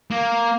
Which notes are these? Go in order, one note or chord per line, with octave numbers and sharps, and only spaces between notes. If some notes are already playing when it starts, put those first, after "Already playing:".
A#3